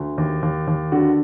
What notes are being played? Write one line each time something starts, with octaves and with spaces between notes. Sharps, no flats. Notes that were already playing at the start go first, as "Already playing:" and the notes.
Already playing: D2
D#2
D#2
D#2
D3 F#4